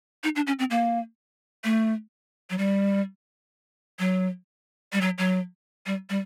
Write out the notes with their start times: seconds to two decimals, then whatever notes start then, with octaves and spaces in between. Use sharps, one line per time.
0.24 D#4
0.36 D4
0.47 C#4
0.59 C4
0.71 A#3
1.64 A3
2.50 F#3
2.58 G3
3.99 F#3
4.93 G3
5.01 F#3
5.18 F#3
5.86 G3
6.10 G3